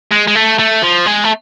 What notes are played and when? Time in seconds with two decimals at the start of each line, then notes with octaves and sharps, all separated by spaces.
0.12 G#3
0.28 G#3
0.35 A3
0.59 A3
0.82 F3
1.06 G#3
1.24 A3